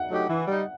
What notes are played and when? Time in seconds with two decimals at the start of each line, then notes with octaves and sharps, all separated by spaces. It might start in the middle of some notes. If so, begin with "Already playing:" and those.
Already playing: F#5
0.09 F#3 A3 D#4 G4
0.28 E3
0.47 G3 D#4